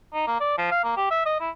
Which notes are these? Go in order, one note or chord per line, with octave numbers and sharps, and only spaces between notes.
D#4
A#3
D5
F3
F5
A#3
G4
E5
D#5
E4